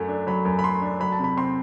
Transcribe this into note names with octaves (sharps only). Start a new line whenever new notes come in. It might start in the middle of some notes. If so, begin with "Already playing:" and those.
Already playing: F#2 F#3 A3
D4
F#3 B5
F#2
B5
A3 C6
D4
F#3 B5
A5
C3 B5
C4 C6